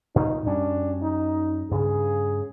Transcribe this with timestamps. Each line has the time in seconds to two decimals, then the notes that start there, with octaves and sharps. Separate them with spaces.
0.16 A#2 D#4
0.46 F#2 G3 C#4 D4
1.02 D#4
1.71 G2 C#3 G#4